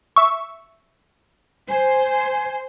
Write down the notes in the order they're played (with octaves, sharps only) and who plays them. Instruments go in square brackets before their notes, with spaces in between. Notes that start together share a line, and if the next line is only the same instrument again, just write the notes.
[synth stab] E5 C#6
[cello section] C5 [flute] G#5